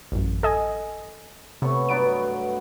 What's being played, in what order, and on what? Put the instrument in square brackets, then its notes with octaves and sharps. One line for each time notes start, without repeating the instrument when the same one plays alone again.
[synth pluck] A1 F#2
A4 D#5 G#5
[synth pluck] C3 [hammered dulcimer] A3 B3 C#5
[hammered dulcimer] G2 F#3 B3 [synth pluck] D7